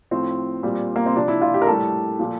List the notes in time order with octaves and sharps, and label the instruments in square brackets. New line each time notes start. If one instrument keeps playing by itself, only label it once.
[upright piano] A2 F3 C4
A#2 G3
A#3
C4
C3 F3 D4
E4
F4
G4
A#4
A2 G3 A4
A#2 F3